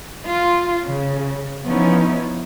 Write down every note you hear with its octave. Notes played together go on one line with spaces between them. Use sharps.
F4
C#3
F3 B3 C#4 D#4 E4